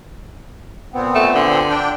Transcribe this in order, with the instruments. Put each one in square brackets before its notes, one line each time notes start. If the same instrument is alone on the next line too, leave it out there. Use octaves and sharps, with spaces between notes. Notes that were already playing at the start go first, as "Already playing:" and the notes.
[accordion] A#2 B3 C4
[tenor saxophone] A3
D3
[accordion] D4 G5